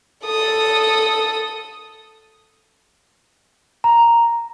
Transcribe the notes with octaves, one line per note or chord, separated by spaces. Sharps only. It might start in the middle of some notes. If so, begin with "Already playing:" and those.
A4 D#6
A#5